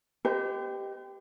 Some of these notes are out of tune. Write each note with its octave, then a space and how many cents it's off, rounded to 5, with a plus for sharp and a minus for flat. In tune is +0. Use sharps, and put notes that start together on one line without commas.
G4 +0 C5 -45 D#5 +0